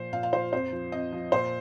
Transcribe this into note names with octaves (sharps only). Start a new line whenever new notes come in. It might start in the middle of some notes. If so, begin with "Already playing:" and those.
Already playing: A#2 F3 C5
A#2 F5
F5
F3 C5
F2 C5
F3
F2 D#5
F3
A#2 C5